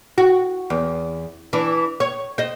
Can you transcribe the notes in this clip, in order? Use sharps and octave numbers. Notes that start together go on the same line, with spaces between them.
F#4
E2
E3 D4
C#5
C5 D#5